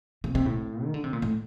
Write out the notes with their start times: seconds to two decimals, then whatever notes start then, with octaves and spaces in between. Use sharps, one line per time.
0.24 C3
0.35 C3
0.46 A2
0.84 D#3
0.94 D3
1.04 C3
1.13 A#2
1.22 A2